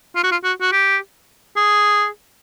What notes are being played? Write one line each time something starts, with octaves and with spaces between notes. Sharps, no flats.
F4
F#4
F4
F#4
F#4
G4
G#4